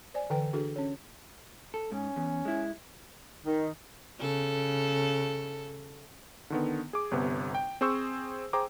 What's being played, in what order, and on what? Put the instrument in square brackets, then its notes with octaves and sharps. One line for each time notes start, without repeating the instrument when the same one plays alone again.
[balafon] C5 D5 G#5
D3 E3 B4 G5
D4 F#4 G#4 A4
C#4 C#5
[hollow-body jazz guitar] A4
[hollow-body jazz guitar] G#2 [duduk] C#4
[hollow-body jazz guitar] E2
G#3 E4
[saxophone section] D#3
[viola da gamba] C#3 A4
[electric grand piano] D3 D#3 B3
G#4 D6
G1 C3 B3
G5
C4 G#4 C5 C#6 E6
G#4 C5 G5 A#5 D6